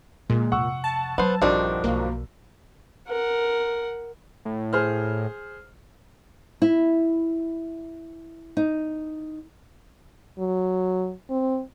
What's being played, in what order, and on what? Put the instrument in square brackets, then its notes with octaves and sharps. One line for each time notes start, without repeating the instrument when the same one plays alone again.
[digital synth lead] A#2 [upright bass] D3 [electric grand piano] G#3
[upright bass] F2 C3 [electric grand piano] F#5 C#6 E6
[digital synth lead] A5
[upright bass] F#3 [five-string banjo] B3 C5
[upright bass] A#1 [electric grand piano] G2 F3 F#4 [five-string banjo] D#3 C4 D4
[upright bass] B1 [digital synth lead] A#3
[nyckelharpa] A#4 F#5
[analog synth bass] A2
[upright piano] G#4 C5 F6
[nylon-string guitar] E4
D#4
[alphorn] F#3
C4